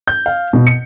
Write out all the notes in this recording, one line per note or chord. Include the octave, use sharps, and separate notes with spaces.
G6
F5
B2
C#7